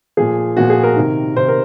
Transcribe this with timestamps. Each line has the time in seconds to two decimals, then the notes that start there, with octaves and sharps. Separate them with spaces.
0.17 A#2 F3 G#4
0.57 A#2 F3 F#4
0.70 G#4
0.84 A#4
0.96 C3 D#3
1.36 C3 D#3 C5
1.48 A#4